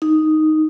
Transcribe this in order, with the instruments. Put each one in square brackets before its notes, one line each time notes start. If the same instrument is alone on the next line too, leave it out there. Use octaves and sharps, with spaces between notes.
[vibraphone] D#4